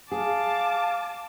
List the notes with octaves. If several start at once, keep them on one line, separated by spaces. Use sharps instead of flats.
G#4 F5 A5 D6